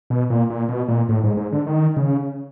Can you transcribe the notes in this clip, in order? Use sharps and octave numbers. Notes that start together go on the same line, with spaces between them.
B2
A#2
A#2
B2
A#2
A2
G#2
G#2
D3
D#3
C#3